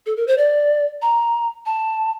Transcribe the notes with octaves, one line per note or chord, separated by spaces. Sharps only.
A4
A#4
C5
D5
A#5
A5